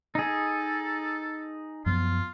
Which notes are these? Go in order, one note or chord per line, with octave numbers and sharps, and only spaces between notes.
D#4 G#4 A4
F#2 F3 B3 F4